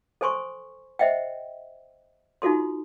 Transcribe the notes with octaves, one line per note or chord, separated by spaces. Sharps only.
A4 C5 G#5 C6 C#6
C5 D#5 E5 F#5 G5
D#4 F4 F#4 A4 C6